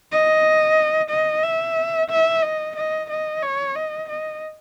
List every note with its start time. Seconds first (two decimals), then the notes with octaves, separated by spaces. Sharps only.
0.12 D#5
1.10 D#5
1.43 E5
2.10 E5
2.42 D#5
2.76 D#5
3.10 D#5
3.43 C#5
3.76 D#5
4.09 D#5